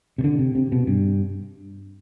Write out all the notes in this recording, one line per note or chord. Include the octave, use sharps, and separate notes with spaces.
C3
D3
C3
C3
B2
G2